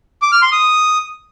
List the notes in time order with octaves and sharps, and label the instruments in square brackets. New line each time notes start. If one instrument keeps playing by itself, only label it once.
[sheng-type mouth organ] D6
F6
C6
D#6